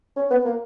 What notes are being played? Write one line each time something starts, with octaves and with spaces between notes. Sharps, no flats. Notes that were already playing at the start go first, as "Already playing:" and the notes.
C#4
B3
A#3